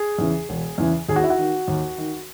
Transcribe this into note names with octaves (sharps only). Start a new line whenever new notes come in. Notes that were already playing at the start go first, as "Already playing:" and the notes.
Already playing: G#4
E2 C#3 E3
E1
E2 C#3 E3
D#2 G#4
F#4
E4
F#4
D#3
D#2
D#3